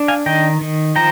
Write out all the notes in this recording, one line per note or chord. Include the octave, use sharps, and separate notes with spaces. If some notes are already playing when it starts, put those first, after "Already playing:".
Already playing: D4
F5 G#5
D#3 D#5 G5
D#3
F3 G5 A#5